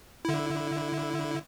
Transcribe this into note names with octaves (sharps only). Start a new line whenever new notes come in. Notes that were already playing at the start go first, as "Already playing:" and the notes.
D3 E4